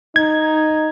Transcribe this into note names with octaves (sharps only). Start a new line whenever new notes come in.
D#4 G#6